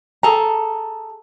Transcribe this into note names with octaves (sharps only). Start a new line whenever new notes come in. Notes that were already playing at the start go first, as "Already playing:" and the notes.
G#4 A4 A#5